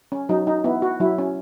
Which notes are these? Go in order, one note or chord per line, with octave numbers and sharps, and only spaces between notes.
C#4
F#3 D#4
D#4
B3 E4
F#4
F#3 E4
C#4